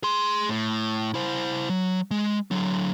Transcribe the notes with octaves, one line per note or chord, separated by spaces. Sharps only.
G#4 C6
A2
E4 C5
F#3
G#3
D3 F#3